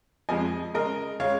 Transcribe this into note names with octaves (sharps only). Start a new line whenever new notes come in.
F2 F3 G#3 D#5 G#5
C#3 G#3 A#4 D#5
C#3 G#3 C#5 F5